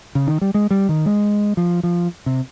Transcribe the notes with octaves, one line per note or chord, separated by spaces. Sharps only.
C#3
D#3
G3
G#3
G3
D#3
G#3
F3
F3
C3